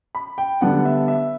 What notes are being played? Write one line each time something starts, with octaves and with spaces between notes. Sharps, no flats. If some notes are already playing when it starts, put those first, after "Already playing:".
B5
G5
D3 G3 B3 D4 F#5
E5
E5